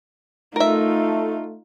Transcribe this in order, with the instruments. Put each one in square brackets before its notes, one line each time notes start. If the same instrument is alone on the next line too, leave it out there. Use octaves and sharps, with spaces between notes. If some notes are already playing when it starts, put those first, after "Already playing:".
[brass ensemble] A3 [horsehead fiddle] D#4 F4 [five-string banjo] A#4 E5